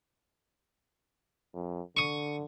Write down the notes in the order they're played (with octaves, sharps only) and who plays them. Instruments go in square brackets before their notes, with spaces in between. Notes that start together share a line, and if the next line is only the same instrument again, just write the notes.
[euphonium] F2
[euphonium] D3 [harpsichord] C#6 D#6